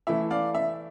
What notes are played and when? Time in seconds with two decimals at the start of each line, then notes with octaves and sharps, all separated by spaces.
0.07 E3 A3 E4 E5
0.30 D5 F5
0.55 E5